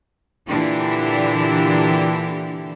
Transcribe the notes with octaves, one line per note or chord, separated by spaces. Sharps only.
A#2 D3 E3 D4 E4 G4